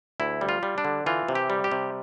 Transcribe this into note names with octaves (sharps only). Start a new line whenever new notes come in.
D2 E4
G3
F4
G3
D4
D3
E3 F4
C3
G4
G3
G4
C3